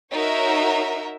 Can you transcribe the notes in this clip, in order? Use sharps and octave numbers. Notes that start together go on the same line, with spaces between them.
D#4 F#4 A#4 C#5 E5